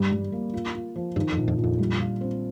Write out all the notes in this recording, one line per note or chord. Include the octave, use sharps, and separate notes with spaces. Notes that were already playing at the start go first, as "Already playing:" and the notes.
Already playing: G2 G3 G4
G3
A#3
F4
F4
F3
G2 D#3
F2
A#1
F2
A#1
F2
G3
F4
C4